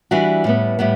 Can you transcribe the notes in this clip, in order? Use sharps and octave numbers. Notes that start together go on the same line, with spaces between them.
E3 G3 D4 F#4
A2 G3 B3
A2 G3 B3